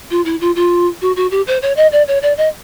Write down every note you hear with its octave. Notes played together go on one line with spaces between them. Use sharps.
F4
E4
F4
F4
F#4
F#4
G4
C5
C#5
D#5
D5
C#5
D5
D#5